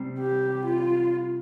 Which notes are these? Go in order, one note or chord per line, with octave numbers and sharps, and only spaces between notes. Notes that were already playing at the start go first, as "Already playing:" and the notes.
Already playing: C3 G3 C4
G4
F4